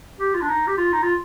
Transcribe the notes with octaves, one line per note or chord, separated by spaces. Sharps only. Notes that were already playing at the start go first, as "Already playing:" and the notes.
G4
F4
D4
D#4
G4
F4
D#4
F4